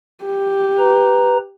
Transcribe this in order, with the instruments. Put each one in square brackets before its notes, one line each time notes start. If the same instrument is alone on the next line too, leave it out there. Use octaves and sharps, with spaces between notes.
[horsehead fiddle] G4
[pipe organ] B4 A#5